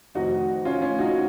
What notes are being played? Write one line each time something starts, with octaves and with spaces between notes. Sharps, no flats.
F1 F2 D#3 D#4 F#4
C#4 F4
C#4 F4
D#4 F#4